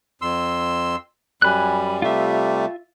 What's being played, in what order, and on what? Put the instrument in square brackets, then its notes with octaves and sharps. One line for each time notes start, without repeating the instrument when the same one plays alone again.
[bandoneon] F2 C6 E6
[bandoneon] F#2 G3 [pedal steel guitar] G#5 B5 F#6
[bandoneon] C3 G3 A3 [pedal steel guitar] F4 E5